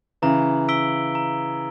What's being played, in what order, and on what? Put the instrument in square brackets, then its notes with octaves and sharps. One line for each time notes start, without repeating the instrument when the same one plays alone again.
[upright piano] C#3 E3 [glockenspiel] A#5
[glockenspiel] E6 B6 D7 G7
A#5